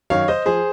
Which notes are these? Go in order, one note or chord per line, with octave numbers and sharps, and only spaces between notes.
F#2 D#3 F#3 C#5 F5
C5 D#5
F3 G#4 C5